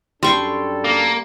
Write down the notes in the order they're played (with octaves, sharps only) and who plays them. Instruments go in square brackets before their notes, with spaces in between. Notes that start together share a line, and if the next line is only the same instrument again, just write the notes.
[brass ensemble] F#2 D4 A4 [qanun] G3 C#6 [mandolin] G5 C6
[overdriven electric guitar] A#3